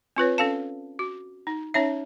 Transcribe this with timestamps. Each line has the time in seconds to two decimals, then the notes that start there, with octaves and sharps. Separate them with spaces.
0.16 C4 F4 B4 C#5
0.38 C#4 A4 F5 A5
0.99 F#4
1.47 D#4
1.74 C#4 D#4 C#5 E5